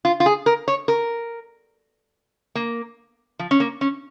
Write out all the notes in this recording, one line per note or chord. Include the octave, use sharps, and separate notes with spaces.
F4
F4
G#4
A#4
C#5
A#4
A#3
F3
C#4
A#3
C#4